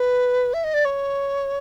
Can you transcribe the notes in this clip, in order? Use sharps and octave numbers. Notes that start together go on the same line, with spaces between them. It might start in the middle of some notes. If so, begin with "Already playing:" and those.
Already playing: B4
E5
D#5
D5
C#5